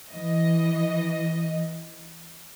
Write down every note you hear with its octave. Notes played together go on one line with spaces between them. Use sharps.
E3 D#5